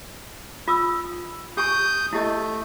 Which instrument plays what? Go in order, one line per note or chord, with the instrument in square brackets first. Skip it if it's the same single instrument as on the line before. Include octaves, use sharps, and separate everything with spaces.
[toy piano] F4 D#6 E6
[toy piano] G4 G#5 C#6 [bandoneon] D#6 G6
[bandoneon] A3 [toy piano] E4 G4 D#5